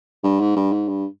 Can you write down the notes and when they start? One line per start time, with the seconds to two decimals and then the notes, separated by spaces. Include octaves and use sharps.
0.24 G2
0.40 G#2
0.56 G2
0.72 G#2
0.88 G2